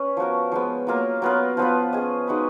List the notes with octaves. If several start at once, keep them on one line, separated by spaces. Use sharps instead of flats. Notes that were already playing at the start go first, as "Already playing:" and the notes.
Already playing: C#4 B4 C#5
F3 B3 F#4 A#4
F3 G#3 B3
F#3 A#3 F4 A#4
F#3 B3 F4 A#4
F3 B3 F4 B4
C#4 G#4 D#5
G#3 D#4 F#4 B4